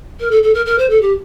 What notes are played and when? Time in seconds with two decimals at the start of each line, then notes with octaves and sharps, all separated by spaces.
0.20 A#4
0.31 A4
0.43 A4
0.54 A#4
0.66 A#4
0.78 C5
0.90 A4
1.02 G4